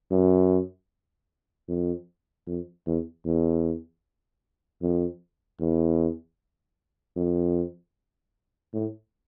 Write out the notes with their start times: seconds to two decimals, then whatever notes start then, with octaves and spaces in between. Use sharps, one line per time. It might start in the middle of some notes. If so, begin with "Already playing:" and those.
0.11 F#2
1.68 F2
2.47 F2
2.86 E2
3.25 E2
4.82 F2
5.60 E2
7.16 F2
8.73 A2